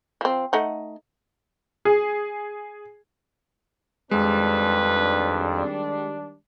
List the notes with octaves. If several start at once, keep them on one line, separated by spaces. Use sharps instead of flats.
F3 C4
A3 D#4 F#5
G#4
F2 D#3 G3 G#3 D4 B4